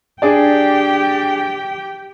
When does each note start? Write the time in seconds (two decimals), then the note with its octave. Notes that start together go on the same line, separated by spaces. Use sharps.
0.22 D4 G4 G#4 D5 G5